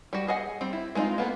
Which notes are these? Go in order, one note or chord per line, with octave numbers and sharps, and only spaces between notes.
G3 F#4
G#4 D#5 F#5 G#5
G3 C4
E4
G#3 B3 C4 D#4 F4
A#3 B3 G#4 A4